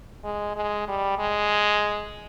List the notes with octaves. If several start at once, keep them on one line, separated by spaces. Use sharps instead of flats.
G#3
G#3
G3
G#3